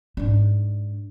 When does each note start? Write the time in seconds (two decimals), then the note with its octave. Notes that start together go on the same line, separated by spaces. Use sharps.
0.17 G#2 D4